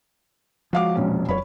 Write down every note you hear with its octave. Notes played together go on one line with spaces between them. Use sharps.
F3 G#3 F#4 F5 D6
E1 A#1 C#4
E1 F2 F#3 C#5 B5